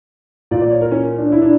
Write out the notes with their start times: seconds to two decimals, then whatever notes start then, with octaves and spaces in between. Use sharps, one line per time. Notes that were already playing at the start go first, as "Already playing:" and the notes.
0.51 A#2 D5
0.61 D5
0.71 C#5
0.81 A#4
0.91 C#4
1.18 D4
1.32 E4
1.42 D4